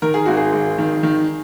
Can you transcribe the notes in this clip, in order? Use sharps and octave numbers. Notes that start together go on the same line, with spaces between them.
D#3 A#4
G#4
G#1 F#4
G#4
G#1
D#3
D#3